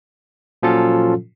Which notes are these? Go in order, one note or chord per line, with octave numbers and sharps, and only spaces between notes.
A#2 F3 F#3 C#4 F4 A4